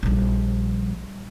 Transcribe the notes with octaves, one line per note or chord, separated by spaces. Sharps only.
A#1 G3